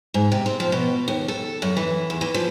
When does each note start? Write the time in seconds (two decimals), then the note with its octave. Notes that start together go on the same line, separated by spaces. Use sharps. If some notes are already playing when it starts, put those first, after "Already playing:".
0.14 G#2
0.32 C3
0.46 C4
0.60 F3
0.72 B2
1.08 D#2
1.28 A4
1.62 F#2
1.77 E3
2.10 E2
2.21 E3
2.34 F3